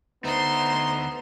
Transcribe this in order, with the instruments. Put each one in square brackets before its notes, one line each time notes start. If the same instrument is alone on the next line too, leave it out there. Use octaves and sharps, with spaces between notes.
[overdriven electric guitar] D2 A3 [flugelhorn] B3 [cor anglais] D#4 [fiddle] C5 C6